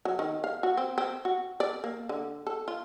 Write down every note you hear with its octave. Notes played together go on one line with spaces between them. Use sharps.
F#3
D#3
F5
F#4
C4
C4
F#4
D5
A#3
D3
A4
F4